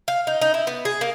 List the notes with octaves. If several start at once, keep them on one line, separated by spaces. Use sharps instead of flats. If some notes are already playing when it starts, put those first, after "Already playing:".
F5
D#4
D#4
E4
B3
G#4
A#3